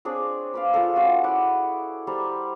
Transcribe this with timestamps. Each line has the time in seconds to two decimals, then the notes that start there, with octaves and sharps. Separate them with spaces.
0.05 C4 D4 G#4 C#5
0.54 B4 D5 F5
0.74 F4 G#4 A4
0.96 C#4 F#4
1.24 E4 D5 F#5
2.07 G3 C5 A5 A#5